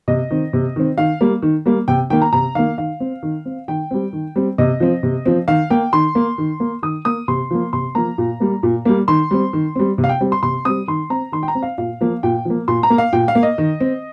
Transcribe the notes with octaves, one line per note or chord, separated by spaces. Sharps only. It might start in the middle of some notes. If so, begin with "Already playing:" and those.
C3 D#5
D#3 C4
C3
D#3 C4
D#3 F5
G3 A#3
D#3
G3 A#3
C3 G5
D#3 A#3 G5
A#5
C3 A#5
D#3 A#3 F5
D#3 F5
C4
D#3
C4
D#3 G5
G3 C4
D#3
G3 C4
C3 D#5
F3 C4
C3
F3 C4
D#3 F5
A#3 G5
D#3 C6
A#3
D#3
A#3
D#3 D#6
A#3 D#6
C3 C6
F3 A#3
C3 C6
F3 A#3 A#5
A#2
G3 A#3
A#2
G3 A#3
D#3 C6
G3 C4
D#3
G3 C4
C3
F5
G5
G3 C4
C6
C3 C6
G3 C4 D#6
D#3 C6
C4 A#5
D#3 C6
G5
A#5
C4
F5
A#2 F5
F3 A#3
A#2 G5
F3 A#3
A#2 C6
A#5
A#3
F5
A#2 G5
F5
A#3
D#5
D#3
C4